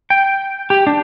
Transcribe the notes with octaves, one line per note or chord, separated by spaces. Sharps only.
G5
G4
D4